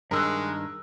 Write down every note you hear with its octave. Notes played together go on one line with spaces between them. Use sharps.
G2 D#3 G#3 A#4 E6 F#6